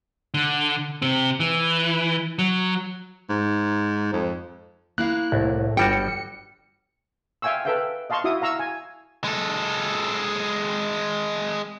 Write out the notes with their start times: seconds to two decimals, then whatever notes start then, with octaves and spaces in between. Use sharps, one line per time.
0.34 D3
1.02 C3 C4
1.40 E3
2.39 F#3
3.29 G#2
4.13 F2
4.98 A#3 E4 F5 F#6
5.32 C2 A2
5.77 G1 G3 F#4 G5 C#7
7.42 E5 F5 G5 G#5 C#6 E6
7.65 A4 B4 E5 F5 G5
8.10 D#5 F5 A5 C6 C#6
8.24 E4 F#4 E5 D#6
8.42 F5 A#5 C#6 E6
8.59 G#5
9.24 G#3 A4